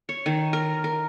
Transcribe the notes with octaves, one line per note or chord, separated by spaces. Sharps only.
C#5
D#3
A#4
A#4